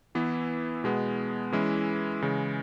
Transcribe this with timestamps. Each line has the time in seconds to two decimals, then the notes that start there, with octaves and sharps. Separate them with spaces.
0.15 E3 B3 E4
0.84 B2 G#3 B3
1.52 E3 G#3 C#4 E4
2.22 C#3 E3 G#3